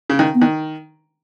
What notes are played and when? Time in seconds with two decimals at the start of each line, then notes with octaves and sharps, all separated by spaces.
0.10 C#3
0.19 D#3
0.35 B3
0.42 D#3